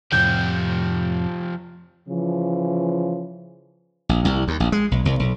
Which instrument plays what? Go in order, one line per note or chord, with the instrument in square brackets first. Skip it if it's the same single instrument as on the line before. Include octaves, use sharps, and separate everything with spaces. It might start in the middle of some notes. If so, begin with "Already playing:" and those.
[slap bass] F2 A2 C3 [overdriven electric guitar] F3 G4 [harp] G6
[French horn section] C#3 E3 F3
[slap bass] A#1
C2
D#2
A#1
G#3
B1
C2
B1